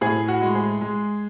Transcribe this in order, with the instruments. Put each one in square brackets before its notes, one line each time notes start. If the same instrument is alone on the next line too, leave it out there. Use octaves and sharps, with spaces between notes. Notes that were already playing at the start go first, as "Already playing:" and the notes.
[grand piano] A2 G#4
F#4
G#3
G#4
G#3